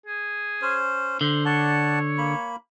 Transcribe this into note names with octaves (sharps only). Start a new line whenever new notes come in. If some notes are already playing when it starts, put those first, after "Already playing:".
G#4
C#4 C5
D3 C5
C#5 D5 F#5 A5
A#3 B5